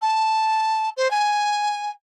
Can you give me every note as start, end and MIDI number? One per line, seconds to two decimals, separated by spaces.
0.01 0.89 81
0.97 1.10 72
1.10 1.90 80